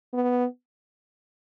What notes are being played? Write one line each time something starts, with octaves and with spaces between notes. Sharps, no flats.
B3